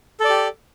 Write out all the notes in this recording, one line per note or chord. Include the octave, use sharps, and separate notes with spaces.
G4 A4 D5